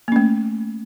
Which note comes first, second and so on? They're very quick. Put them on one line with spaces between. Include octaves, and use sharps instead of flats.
A#3 C#4 A3